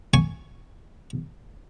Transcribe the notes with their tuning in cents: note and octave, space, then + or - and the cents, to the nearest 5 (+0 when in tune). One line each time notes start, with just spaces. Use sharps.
G#5 +0 C#6 +0